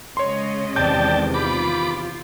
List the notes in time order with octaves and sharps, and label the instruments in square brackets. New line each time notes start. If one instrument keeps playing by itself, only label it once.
[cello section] C#3 G#3 D#5 [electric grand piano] C#5 C6
[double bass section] E2 C3 D#3 [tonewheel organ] D5 G5 A5 [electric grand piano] G6
[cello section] F4 [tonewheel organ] B5 D6